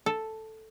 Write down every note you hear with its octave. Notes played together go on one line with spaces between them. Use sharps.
A4